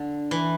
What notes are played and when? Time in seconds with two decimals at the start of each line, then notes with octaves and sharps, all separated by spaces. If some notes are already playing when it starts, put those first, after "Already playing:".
Already playing: D3
0.31 E3